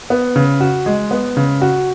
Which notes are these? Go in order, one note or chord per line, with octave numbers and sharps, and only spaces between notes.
B3
C#3
F#4
G#3
B3
C#3
F#4